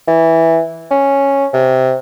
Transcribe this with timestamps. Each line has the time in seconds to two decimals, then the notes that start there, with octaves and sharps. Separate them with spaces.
0.08 E3
0.91 C#4
1.54 C3